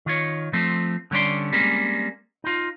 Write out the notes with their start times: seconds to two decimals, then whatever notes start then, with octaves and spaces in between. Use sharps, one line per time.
0.06 D#3 F4 C#5
0.53 F3 A3 C4
1.11 D3 G3 C#4 D5 C6
1.52 G3 G#3 A#3 C4 C#4
2.44 D#4 F4